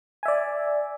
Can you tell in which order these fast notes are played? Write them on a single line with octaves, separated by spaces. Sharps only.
G#5 E5 D5